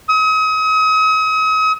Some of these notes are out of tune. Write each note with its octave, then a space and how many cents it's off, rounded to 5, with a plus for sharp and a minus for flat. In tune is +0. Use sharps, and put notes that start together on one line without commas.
D#6 +40